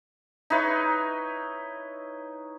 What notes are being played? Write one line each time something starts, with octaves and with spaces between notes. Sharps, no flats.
D#4 E4 B4 C#5